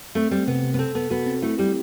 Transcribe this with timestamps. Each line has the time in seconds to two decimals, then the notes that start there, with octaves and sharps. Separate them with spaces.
0.15 A3 C4
0.31 G3 C4
0.48 C3 B3
0.63 C3
0.74 B3
0.79 C4 A4
0.95 B3 A4
1.10 B3 F#4
1.26 C4
1.42 A3 E4
1.59 G3 G4